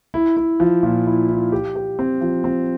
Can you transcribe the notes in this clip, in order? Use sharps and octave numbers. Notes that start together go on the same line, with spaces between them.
E4
E4
F3
A#2
E4
E4
G4
G4
C4
F3
C4